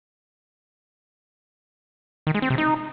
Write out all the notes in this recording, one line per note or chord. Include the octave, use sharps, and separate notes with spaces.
D#3
G#3
C4
C3
D#4